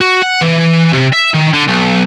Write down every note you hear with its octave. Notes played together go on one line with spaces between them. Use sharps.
F#4
F#5
E3
C3
E5
D#3
D3
B1